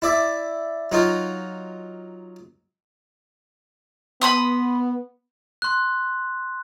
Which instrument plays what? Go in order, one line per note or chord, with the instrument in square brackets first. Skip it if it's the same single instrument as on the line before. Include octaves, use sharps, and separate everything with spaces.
[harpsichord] E4 D5 E5
F#3 D#4 F4
[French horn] B3 [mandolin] B5 C6 D#6
[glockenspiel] C6 F#6